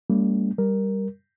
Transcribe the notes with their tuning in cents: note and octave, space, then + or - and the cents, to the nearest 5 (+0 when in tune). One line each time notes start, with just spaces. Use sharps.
G3 +15 A#3 -30 C#4 +35
G3 +0 A#4 +0